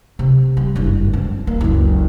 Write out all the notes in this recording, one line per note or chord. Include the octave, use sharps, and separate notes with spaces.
C3
G3
F#1 G2
G#3 C4
A#3
F#1 C#2